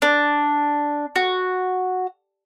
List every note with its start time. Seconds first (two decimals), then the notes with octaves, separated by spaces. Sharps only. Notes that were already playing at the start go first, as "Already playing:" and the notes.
0.02 D4
1.16 F#4